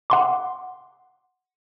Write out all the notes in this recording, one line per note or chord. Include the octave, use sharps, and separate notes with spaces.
F#5 C6 D6